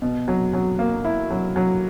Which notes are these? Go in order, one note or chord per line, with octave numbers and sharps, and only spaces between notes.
B2
F#3
F#3
A#3
E4
F#3
F#3